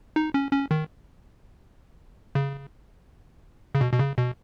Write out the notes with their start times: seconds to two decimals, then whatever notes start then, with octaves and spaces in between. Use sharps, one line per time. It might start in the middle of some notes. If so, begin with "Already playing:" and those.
0.16 D#4
0.34 C#4
0.52 C#4
0.71 D#3
2.35 C#3
3.75 C#3
3.81 B2
3.93 B2
3.99 C#3
4.18 B2